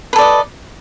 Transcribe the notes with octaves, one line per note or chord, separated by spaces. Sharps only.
A4 B4 D5 D#5